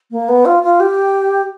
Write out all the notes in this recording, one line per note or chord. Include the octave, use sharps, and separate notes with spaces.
A#3
B3
F4
F4
G4